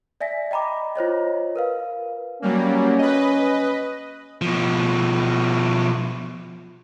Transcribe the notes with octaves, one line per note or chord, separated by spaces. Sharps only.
D5 E5 G#5 A#6 B6
D#5 G5 A#5 B5 D6
F4 C5 C#5 D#5
A#4 B4 F5
F#3 G3 A#3 C#4
B4 D#5
B2 F3